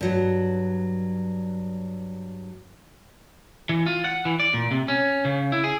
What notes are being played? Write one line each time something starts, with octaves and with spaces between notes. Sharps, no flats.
G2 F#3
E3
F4
F#5
E3
D5
A#2
C3
C#4
C#3
E4
G#4